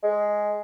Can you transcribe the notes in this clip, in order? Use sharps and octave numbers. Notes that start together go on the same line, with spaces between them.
G#3